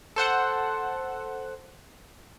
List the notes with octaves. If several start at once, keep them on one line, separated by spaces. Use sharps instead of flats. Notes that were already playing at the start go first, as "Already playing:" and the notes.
A4 C5 F#5